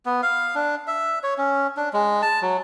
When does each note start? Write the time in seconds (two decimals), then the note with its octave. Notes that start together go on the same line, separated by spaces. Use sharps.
0.05 B3
0.23 F5
0.55 D4
0.87 E5
1.23 C#5
1.38 C#4
1.77 D4
1.93 G#3
2.22 A5
2.42 F#3